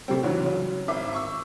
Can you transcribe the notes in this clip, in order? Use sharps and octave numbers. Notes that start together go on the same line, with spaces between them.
C3 G3 A3 C4
G#2 C#3 E3 F#3
C#3 F#3
G#1 E5 D6
C#6 E6